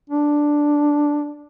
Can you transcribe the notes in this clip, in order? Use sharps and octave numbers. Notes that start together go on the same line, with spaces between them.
D4